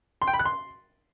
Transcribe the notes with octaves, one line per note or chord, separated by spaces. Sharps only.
C6
G5
B5
F#6
C6